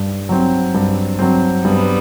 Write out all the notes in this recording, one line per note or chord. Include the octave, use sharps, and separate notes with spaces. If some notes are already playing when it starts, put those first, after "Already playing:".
Already playing: G2
F#3 C4
G2
F#3 C4
G2 G3 B3